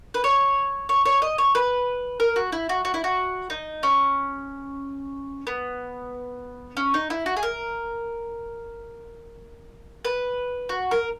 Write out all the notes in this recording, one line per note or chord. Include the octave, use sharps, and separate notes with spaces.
B4
C#5
C#5
C#5
D#5
C#5
B4
A#4
F#4
E4
F#4
F#4
E4
F#4
D#4
C#4
B3
C#4
D#4
E4
F#4
G#4
A#4
B4
F#4
A#4